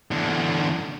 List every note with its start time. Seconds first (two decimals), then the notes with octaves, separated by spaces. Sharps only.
0.11 E2 D3